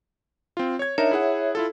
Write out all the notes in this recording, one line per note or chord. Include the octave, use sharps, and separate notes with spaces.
C4 F4
C#5 G#6
D4 D#4 A#4 C#5 E5
E4 G#4 F#5
E4 F4 A4